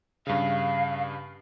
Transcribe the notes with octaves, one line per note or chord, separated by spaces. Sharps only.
G2 C#3 F5